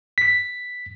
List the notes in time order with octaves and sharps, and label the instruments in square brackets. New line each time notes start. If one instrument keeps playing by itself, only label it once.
[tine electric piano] B6